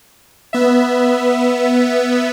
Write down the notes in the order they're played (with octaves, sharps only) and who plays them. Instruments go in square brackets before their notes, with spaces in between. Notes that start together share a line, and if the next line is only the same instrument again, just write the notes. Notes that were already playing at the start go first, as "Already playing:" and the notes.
[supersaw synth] B3 E5